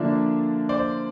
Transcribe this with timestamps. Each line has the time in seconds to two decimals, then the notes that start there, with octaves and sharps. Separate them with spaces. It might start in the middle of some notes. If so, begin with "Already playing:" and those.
Already playing: D3 F3 A#3 D4 F4 D5 E5
0.69 C5 D5